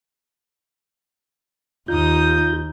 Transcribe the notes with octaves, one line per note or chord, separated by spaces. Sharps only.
D#2 D#4 F4 D#6 G6